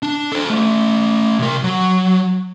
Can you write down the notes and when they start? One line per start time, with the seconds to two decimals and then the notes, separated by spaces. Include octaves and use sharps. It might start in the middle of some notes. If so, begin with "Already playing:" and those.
0.03 D4
0.32 A4 C5
0.50 A3 C#4
1.39 C3 A#4
1.64 F#3